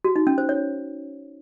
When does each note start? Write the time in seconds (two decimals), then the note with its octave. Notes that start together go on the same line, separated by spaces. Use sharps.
0.04 F#4
0.16 D#4
0.27 C#4
0.38 C5
0.49 C#5